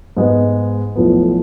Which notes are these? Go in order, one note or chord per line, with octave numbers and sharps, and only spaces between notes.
G#2 G#3 B3
B1 A2 F3 B3